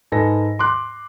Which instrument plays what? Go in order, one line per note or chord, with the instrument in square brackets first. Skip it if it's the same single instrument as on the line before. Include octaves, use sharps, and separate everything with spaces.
[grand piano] G#2 A4 B4 G#5 A#6
C6 D6 F#6